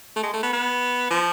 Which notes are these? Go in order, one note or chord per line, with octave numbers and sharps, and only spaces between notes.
A3
G#3
A3
B3
B3
F3